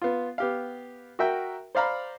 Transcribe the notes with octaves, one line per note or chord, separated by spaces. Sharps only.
B3 F4
B3 G4 F5
F#4 A#4 E5 G5
C5 D5 F5 A#5 B5